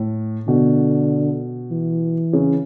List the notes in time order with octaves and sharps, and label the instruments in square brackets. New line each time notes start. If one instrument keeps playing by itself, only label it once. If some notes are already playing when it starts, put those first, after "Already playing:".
Already playing: [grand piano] A2
[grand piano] B2 [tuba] D3
[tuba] E3
[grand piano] C#3